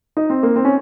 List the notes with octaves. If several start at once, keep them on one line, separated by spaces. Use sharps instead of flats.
D#4
C4
A#3
C4
C#4